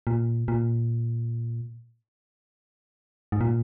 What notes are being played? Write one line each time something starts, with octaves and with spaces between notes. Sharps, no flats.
A#2
A#2
G#2
A#2